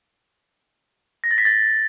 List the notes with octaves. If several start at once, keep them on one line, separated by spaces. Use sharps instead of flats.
A#6
A6
B6
A6